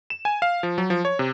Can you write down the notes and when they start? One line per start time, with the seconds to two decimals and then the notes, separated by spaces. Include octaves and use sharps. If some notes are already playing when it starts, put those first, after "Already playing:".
0.10 E7
0.25 G#5
0.42 F5
0.63 F3
0.78 F#3
0.90 F3
1.05 C#5
1.19 C3